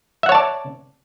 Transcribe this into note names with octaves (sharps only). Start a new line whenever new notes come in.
C#5 D5 E5 F#5 A5